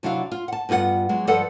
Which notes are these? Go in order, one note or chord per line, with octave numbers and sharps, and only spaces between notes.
C3 F#3 D4 E4 F#4 F5
F4
F#5 A5
G2 B3 F4 G#4 F#5
F#3 G#3
G2 F3 A4 B4 D5 F#5